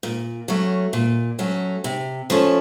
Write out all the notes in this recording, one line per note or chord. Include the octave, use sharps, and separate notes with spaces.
A#2
F#3 A3 C#4
A#2
F#3 A3 C#4
C3
F3 A3 C#4